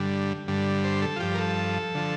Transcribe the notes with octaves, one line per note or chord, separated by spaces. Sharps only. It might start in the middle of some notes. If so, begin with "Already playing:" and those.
Already playing: G2 D3 G3
G2 D3 G3
C5
A4
F4
G2 F3 G4
A#4
A4
D3 F3